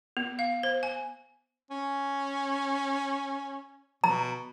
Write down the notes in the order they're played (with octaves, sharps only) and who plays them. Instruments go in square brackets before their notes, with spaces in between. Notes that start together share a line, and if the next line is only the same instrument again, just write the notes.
[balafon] B3
F5
C5
G#5
[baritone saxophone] C#4
[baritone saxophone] B2 [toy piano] A#5